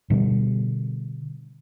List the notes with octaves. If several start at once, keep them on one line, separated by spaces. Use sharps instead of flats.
B2 D3 G3